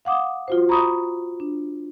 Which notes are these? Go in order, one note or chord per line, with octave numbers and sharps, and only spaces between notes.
F5 F#5 D6 D#6
F4 F#4 C5
A#5 B5 C#6 D#6
D4